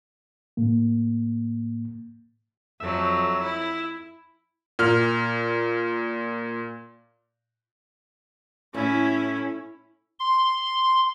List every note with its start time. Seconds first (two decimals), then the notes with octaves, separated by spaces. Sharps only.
0.57 A2 A#3
2.80 F2 F#3 E5
3.44 E4
4.79 A#2 F6
8.74 A2 C#4 E4
10.19 C6